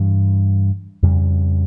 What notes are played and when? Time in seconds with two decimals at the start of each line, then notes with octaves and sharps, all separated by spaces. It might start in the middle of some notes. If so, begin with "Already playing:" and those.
Already playing: G2 E3 G3
1.02 F2 C#3 G3